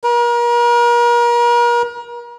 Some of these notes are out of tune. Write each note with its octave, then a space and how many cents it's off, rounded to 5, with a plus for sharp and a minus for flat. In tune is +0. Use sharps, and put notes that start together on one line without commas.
A#4 +40